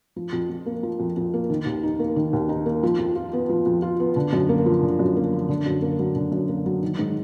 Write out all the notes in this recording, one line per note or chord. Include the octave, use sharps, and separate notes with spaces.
F3
F2
F2
A#3
F3
F2
F2
A#3
D#3
D#2
D#4
A#3
D#3
D#2
D#4
A#3
F3
F2
F4
B3
F3
F2
F4
B3
D3
F#2
A#3
F3
D3
F#2
A#3
F3
D3
F#2
A#3
F#3
D3
F#2
A#3
F#3
D#3
G#2